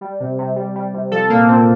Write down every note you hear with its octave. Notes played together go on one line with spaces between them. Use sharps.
G3
C3
C3
G3
G3
C3
F3 A4
A#2 A#3
A#2 C4